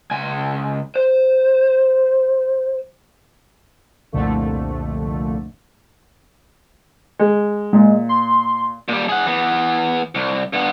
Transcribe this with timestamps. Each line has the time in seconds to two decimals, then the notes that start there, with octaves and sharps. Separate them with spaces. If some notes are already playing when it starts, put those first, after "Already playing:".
0.11 C#2 G#5
0.96 C5
4.12 C2 F2 A#2 D3 A3
7.19 G#3
7.73 A#2 G#3
8.09 C6
8.88 A#2 G3
9.09 G#4 F#5
9.26 E3 B3
10.15 C2
10.53 G2 B3